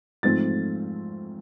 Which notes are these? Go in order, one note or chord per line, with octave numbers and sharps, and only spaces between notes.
G#2 F3 A3 C4 A6